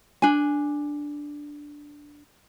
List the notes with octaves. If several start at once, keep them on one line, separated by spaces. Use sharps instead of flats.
D4 G#5